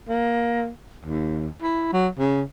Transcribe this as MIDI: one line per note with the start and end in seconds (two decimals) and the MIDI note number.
0.09 0.69 58
1.05 1.48 39
1.62 1.91 64
1.93 2.08 54
2.19 2.43 49